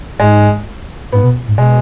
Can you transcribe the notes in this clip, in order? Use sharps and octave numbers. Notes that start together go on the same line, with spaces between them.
G#2 G#3
G#2 B3
B2
G#2
B2 G#3